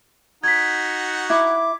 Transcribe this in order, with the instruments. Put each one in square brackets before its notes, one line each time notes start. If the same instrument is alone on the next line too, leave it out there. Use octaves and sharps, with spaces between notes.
[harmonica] D#4 F#4 F#5 [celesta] G#6 B6
[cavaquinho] E4 [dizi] D6